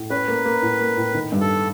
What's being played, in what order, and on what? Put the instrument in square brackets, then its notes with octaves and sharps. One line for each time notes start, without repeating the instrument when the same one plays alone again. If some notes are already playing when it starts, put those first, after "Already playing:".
Already playing: [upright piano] A2
[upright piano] C#4 [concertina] B4
[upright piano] A#3
A#3
A2
A#3
A2
D#3
G2
[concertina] A4